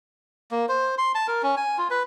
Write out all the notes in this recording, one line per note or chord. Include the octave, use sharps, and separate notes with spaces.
A#3
C5
C6
A5
A#4
C#4
G#5
F4
B4